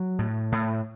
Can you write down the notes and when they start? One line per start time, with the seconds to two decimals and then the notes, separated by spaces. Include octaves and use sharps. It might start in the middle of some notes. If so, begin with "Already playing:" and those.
Already playing: F#3
0.19 A2
0.52 A2